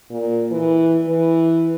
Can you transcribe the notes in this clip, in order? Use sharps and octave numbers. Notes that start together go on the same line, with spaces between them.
A#2
E3
E3